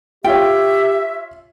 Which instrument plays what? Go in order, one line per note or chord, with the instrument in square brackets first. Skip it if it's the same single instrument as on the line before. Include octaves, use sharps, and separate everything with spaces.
[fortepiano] F4 C#5 [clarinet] G4 [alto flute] E5 [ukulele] G5